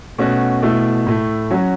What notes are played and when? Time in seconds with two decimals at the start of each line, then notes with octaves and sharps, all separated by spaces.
0.18 B2 A3 C#4 F#4
0.62 B2 A3 E4
1.07 A2 A3 E4
1.51 F#3 C#4 F#4